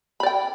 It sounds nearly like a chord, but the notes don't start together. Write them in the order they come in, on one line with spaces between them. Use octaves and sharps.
B5 D5 G5